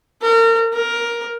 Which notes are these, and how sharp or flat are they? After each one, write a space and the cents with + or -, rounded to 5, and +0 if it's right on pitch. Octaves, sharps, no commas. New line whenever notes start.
A#4 -35
A#4 +10